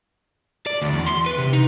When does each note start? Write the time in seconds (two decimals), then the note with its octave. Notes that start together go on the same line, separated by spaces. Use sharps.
0.67 D5
0.82 D2
0.93 E2
1.07 C6
1.26 B4
1.38 C3
1.53 D#4